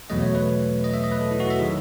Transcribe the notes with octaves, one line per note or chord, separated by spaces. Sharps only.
E2 B2 F#3 A3 D#5
C#5
B4
D#5
E5
D#5
B4
A4
E4
F#4
E5
D#3 F#3 G#4